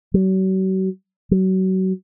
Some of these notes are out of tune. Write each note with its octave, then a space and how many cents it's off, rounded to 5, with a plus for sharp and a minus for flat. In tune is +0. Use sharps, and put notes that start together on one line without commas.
F#3 +40
F#3 +30